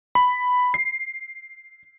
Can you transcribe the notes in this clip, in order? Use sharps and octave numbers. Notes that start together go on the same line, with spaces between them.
B5
C7